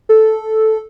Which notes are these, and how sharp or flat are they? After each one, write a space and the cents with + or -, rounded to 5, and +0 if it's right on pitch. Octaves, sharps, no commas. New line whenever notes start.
A4 -5